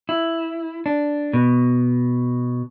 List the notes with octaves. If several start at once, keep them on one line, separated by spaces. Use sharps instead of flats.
E4
D4
B2